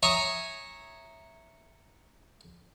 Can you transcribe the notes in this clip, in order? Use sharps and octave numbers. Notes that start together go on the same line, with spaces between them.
C#5 E5 G#5 A#5 C#6 D#6